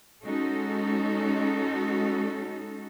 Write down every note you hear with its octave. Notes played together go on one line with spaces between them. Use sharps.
G#3 C#4 D#4 F#4 A4